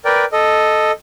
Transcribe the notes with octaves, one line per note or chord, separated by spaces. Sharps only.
A#4 B4 D5 G5
A4 D#5